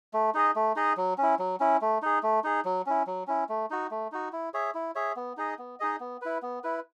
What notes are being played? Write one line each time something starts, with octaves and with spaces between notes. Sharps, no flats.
A3
D#4 G#4 D#5
A3
D#4 G#4 D#5
F#3
C#4 E4
F#3
C#4 E4
A3
D#4 G#4
A3
D#4 G#4
F#3
C#4 E4
F#3
C#4 E4
A3
D#4 F#4
A3
D#4 F#4
E4
G#4 C#5 E5
E4
G#4 C#5 E5
B3
D#4 G#4 D#5
B3
D#4 G#4 D#5
B3
E4 B4
B3
E4 B4